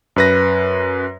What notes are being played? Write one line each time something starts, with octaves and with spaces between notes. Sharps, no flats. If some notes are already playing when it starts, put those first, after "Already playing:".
F#2 B4 A#6